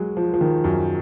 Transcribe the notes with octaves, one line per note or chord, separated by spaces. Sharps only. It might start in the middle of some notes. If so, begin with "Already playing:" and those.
Already playing: F#3 G#3
F3
F3
D#3
F#2